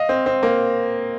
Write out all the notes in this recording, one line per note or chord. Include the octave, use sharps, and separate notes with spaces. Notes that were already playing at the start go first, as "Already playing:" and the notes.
Already playing: D#5 F5
C4
C4
A#3